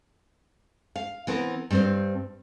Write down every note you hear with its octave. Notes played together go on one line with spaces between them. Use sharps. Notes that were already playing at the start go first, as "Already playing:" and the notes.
F5
E3 B3 C4 A#4
G2 C4 C5